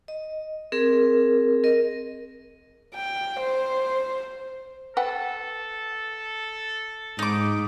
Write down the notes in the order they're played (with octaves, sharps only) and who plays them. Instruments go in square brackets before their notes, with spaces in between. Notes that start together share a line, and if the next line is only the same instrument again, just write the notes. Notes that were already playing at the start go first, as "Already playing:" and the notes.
[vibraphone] D#5
C4 G#4 A#4
A#4 D#5
[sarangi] G5
C5
[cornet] A4 [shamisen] B4 F#5 G5
[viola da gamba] G#2 [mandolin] D#4 D6